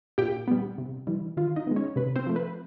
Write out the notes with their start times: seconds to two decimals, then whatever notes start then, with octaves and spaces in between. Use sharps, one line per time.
0.18 A#2 G4 G5
0.48 G3 B3
0.78 C3
1.07 E3 G3
1.37 D#3 F4 F5
1.56 D#4 D#5
1.67 G#3 B3
1.76 C#4 C#5
1.96 C3 B4
2.16 C4 C5
2.26 F3 A3
2.36 B4